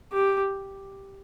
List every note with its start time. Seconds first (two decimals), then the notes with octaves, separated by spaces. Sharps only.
0.13 G4